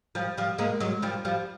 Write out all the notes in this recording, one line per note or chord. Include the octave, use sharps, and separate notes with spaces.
F3 G3
F3 G3
G#3 A#3
F#3 G#3
F3 G3
F3 G3